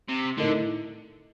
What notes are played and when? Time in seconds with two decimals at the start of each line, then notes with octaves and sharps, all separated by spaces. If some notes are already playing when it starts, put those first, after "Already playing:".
0.08 C3
0.37 A2 D3 A3 D#4 A#4 D#5